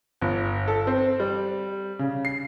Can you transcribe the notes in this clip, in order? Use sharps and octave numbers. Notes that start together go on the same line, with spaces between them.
G1
A4
C4
G3
C#3
C7